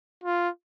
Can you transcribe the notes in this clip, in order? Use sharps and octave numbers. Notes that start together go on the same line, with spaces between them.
F4